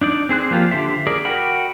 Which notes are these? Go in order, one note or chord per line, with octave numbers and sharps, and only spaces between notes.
D4 D#4 D5
C4 G#4 C5 F#6
F3 A#3 F4 G4
D3 G4 C5 E5
G#4 A#4 D5
F#4 A#4 F#5 G5 B5